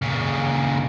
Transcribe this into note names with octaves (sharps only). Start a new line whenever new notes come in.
A#2 C#3